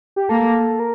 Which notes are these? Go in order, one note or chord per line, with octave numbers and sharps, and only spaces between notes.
G4
A#3 A4
A#4